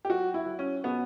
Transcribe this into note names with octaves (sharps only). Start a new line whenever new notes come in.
G4
F#3 F#4
E4
F#3
C#4
B2 B3